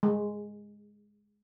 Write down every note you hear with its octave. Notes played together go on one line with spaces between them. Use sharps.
G#3